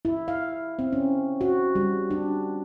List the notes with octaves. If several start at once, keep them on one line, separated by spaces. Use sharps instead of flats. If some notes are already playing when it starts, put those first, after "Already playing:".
E4
F5
C4
C#4
F#4
G3
D4